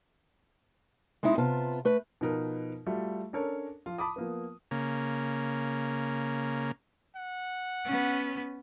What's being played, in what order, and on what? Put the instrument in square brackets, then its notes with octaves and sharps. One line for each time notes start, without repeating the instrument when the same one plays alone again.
[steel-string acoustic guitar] G#3 C4 D#4 E4
C3 B3 F4 A5
A3 B4
[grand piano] B2 F3 D#4 A#4 B4
G3 A3 F4 F#4
C#4 D4 A4 A#4 C#5
F3 F4
A5 B5 D6 D#6
F3 A#3 B3
[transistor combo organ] C#3 A#3
[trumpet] F#5
[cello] B3 C#4